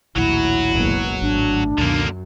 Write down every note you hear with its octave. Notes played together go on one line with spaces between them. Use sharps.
A#1 D#2 A2 F#3 E4 F#4
F#1 C#2 B2
G#1 A2 D4
C#2 F#2 B2 D3 D#3 A#3